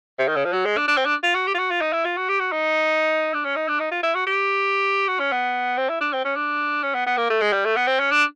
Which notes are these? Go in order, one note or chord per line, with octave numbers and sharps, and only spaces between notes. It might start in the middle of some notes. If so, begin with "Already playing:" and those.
C3
D#3
C#3
F3
F#3
G#3
D4
D4
C4
D4
F4
F#4
G4
F4
F#4
F4
D#4
E4
F4
F#4
G4
F#4
D#4
D4
C#4
D#4
D4
D#4
F4
E4
F#4
G4
F#4
C#4
B3
C4
E4
D4
C4
C#4
D4
C#4
B3
B3
A#3
A3
G#3
G3
A3
B3
C4
C#4
D4